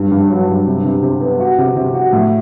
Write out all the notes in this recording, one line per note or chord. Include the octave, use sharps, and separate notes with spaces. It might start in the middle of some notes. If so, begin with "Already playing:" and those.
Already playing: G2
G2
F#3
G2
C3
C3
C3
B3
F#4
C3
C3
F#4
A2